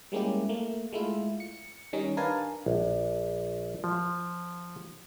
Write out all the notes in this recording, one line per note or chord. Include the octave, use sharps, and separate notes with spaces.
G3 G#3 A#3 C#4 E4 G4
A3 A#3
G#3 A3 E4 F4
C#7
D#3 G3 C#4 D#4
D4 A#4 B4 F5 G#5 A5
A#1
F3